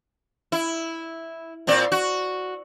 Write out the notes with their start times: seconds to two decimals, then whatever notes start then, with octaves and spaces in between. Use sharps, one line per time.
0.52 E4
1.67 A#2 C4 D5
1.92 F#4